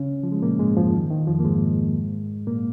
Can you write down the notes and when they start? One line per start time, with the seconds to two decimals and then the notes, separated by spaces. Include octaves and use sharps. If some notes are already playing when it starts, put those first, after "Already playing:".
Already playing: C#3 C#4
0.23 F3
0.32 G#3
0.42 A#2 A#3
0.59 G#2 G#3
0.77 F2 F3
0.94 D#3
1.11 D#3
1.27 F2 F3
1.40 A#3
1.44 G#2 G#3
2.47 A#2 A#3